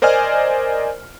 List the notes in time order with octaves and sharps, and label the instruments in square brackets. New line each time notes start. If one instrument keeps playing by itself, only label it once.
[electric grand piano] A#4 C5 D5 D#5 G#5 F6